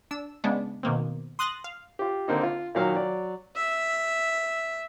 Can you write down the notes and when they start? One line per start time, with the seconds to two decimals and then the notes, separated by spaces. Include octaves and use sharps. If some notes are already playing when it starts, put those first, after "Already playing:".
0.11 D4 E6
0.44 C#3 G#3 B3 D4
0.83 B2 D#3 A#3 C4
1.39 C6 D#6 F#6 A6 A#6
1.64 F5
1.99 F4 G4
2.28 D3 A#3 C4 D#4
2.43 F4
2.75 A#2 D#3 F#3 F5 A#5 F6
2.94 F#3 D5
3.55 E5